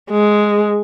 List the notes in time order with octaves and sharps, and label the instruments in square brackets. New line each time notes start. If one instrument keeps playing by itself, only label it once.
[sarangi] G#3